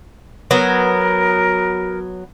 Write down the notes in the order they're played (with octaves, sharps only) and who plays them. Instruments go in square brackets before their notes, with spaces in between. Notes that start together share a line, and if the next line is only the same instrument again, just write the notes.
[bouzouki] F#3 B3 [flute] A#4